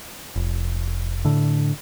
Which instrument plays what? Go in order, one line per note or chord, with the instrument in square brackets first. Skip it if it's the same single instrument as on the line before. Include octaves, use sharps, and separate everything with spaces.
[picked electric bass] F1
A2 D3